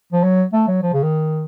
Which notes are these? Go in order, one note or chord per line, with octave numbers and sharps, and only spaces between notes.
F3
F#3
A3
F#3
F3
C#3
D#3